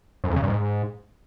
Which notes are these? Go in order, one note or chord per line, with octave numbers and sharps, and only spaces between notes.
F#2
F2
C#3
G2
G#2